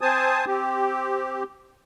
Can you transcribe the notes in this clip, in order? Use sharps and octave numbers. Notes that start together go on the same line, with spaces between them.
C4 C5 G#5 A5 D#6
C4 G4